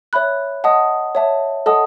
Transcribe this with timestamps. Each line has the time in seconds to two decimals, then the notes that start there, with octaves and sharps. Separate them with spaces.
0.13 C#5 E5 B5 F#6
0.64 D#5 F#5 A5 D#6
1.15 C#5 E5 A5
1.66 A4 D#5 F#5 A5 D#6